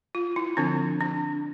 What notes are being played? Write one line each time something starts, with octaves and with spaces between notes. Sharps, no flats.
F4
E4
D3 F3 C4 D4
D4